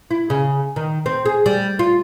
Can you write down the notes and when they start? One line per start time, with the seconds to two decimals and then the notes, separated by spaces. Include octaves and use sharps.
0.11 E4
0.30 C#3
0.76 D#3
1.06 C4
1.26 G#4
1.46 G3
1.79 F4